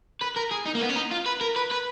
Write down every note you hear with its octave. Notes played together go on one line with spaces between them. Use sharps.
B4
A#4
G#4
D#4
A#3
B3
C#4
D#4
F4
B4
A#4
B4
B4